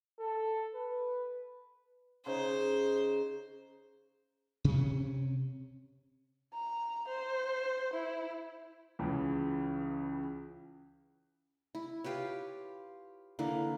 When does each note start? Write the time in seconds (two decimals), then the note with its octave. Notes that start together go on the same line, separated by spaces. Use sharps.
0.19 A4
0.74 B4
2.26 C#3 D#4 C5
4.64 C3 C#4
6.53 A#5
7.08 C5
7.94 E4
8.99 C#2 C#3 E3
11.75 E4
12.04 F4 G4 B4 C#5
13.39 D3 E3 A#3 E4